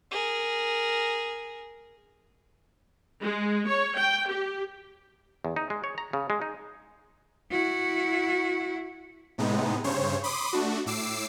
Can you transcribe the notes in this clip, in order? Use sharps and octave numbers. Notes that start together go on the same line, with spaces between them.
G#4 A#4
G#3
C#5
G5
G4
E2
D#4
G#3
C#5
A#5
C#3
G#3
D#4
E4 F#4
A2 C3 G#3 B3 D#4
G2 C#3 C5 C#5
B5 C6 D6 D#6
A3 D4 F#4
A2 D6 E6 C7